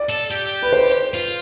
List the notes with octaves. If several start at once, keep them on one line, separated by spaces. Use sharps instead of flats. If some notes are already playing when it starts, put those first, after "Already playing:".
Already playing: D5
A4
G4
B4
C5
F4